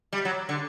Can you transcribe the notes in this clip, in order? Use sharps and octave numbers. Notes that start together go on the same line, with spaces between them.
G3
F#3
D3